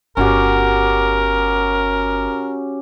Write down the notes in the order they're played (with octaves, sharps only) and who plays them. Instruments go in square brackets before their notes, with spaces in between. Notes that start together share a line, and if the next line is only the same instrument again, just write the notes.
[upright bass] G1 [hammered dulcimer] C#4 F#4 G4 [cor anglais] A#4